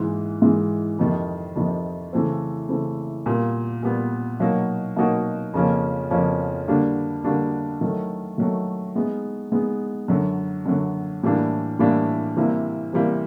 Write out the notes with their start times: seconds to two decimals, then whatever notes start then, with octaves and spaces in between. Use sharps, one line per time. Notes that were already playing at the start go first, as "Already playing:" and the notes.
Already playing: G#2 E3 G#3
0.42 G#2 E3 G#3
0.99 F2 C3 D#3
1.56 F2 C3 D#3
2.13 C#3 E3 A3 C4
2.69 C#3 E3 A3 C4
3.26 A#2 G3 B3
3.83 A#2 G3 B3
4.40 B2 F#3 A#3 D#4 F#4
4.96 B2 F#3 A#3 D#4 F#4
5.54 F2 C#3 F3 A#3 C#4
6.11 F2 C#3 F3 A#3 C#4
6.68 D3 G3 A#3 D4 F#4
7.24 D3 G3 A#3 D4 F#4
7.81 D#3 F#3 A3
8.38 D#3 F#3 A3
8.96 G#3 B3 D#4
9.52 G#3 B3 D#4
10.08 F#2 D3 F#3
10.66 F#2 D3 F#3
11.23 A2 E3 G3 A#3 D4
11.79 A2 E3 G3 A#3 D4
12.36 C3 E3 G3 A#3
12.93 C3 E3 G3 A#3